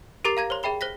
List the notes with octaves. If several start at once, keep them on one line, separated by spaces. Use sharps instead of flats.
G4 A#4 A#5 D6 A6 C7
F5 A#5 G#6 A#6
C5 C#5 C6
G#4 E5 G5 B5 G7
C5 F#6 A#6 B6